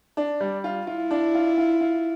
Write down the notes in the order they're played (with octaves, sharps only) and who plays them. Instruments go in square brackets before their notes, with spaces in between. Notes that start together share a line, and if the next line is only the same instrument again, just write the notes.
[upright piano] D4
G3
F4
[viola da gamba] E4 [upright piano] F4
[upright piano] D4
F4
F4
F4